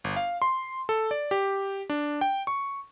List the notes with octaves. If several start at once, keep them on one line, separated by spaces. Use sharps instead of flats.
G1
F5
C6
A4
D5
G4
D4
G5
C#6